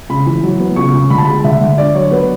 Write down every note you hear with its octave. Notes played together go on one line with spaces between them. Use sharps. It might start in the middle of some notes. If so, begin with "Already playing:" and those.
C#3 B5
E3
F#3
B3
C#3 C#6
C#3
D3 B5
A5
G#3 B5
D3 E5
D3
D4 D5
F#3 C#5
B3 B4